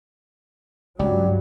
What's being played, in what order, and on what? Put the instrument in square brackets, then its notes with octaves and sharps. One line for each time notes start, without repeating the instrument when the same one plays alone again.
[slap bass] C#2 [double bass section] G2 F#3 [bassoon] G3